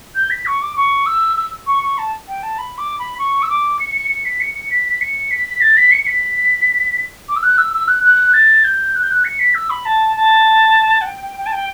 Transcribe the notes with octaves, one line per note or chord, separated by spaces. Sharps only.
G6
B6
C#6
D6
C#6
E6
E6
C#6
C#6
A5
G5
A5
B5
D6
B5
C#6
E6
D6
C#7
C#7
C#7
B6
C#7
C#7
B6
B6
C#7
B6
A6
B6
C#7
C#7
B6
D6
E6
F#6
E6
E6
F#6
F#6
A6
G6
F#6
G6
F#6
C#7
B6
E6
B5
A5
A5
F#5
G5
G5
G5
A5
G5